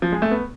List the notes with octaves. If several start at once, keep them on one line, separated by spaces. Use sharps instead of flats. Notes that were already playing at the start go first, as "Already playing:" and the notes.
F3
G#3
A3
B3